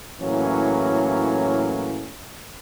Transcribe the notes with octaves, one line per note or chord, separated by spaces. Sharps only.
A2 E3 F#3 A#3 C#4